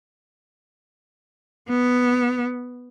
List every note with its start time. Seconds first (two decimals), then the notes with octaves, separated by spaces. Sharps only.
1.69 B3